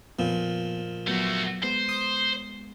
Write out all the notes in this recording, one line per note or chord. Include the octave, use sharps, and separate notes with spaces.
F2 A#2 F3 B3
F#3 A3 B3 F#4
G#3 B3 C5
D#6